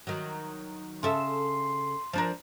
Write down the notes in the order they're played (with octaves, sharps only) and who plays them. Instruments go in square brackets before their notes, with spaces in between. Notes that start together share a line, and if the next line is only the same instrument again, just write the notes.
[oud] D#3 F#3
[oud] C#3 A4 E5 [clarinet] C6
[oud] F3 D4 A#4